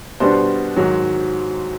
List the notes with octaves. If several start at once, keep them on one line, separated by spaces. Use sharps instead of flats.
B2 G3 B3 D4 C5 C6
G#2 D#3 F#3